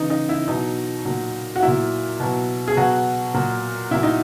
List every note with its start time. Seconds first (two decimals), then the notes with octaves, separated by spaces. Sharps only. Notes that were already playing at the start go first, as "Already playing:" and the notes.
Already playing: C#3 E3 D#4
0.10 D#4
0.29 E4
0.48 B2 F#3 D#4
1.05 A#2 F#3
1.56 F#4
1.62 A#2 F#3 E4
2.20 B2 F#3
2.68 G#4
2.77 B2 F#3 F#4
3.34 A#2 F#3
3.91 A#2 F#3 E4
4.03 D#4